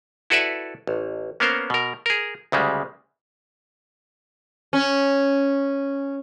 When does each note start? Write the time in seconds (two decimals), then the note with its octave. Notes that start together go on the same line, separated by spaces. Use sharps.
0.30 E4 F#4 A4 B4 D5 E5
0.87 A1
1.40 A#3 B3 C#4 A#4 C5
1.70 B2 A#4
2.06 G#4 A#4
2.52 D2 C#3 G3 G#3
4.73 C#4